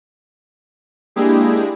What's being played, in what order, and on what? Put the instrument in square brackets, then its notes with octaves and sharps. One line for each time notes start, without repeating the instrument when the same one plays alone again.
[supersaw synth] G#3 A#3 D4 E4 G4 G#4